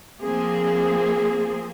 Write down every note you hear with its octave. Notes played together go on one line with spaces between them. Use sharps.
F3 A#3 C4 G#4